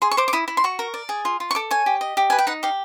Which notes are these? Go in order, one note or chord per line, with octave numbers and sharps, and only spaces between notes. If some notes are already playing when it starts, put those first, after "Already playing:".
G#4 C6
C#6
C5 D6
D6
E4 D#6
E4
C6
F#4 C#6
A#4
D5
G#4
F4
F4
C#6
A4 D6
C#5 G#5
G4
D#5
G4
B4 G#5
G5
D#4 F#5
G4 F5